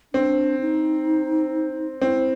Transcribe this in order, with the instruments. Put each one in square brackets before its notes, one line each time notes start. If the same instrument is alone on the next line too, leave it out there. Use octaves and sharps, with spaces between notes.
[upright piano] C4 [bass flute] D4
[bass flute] D#4
[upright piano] C4 [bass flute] E4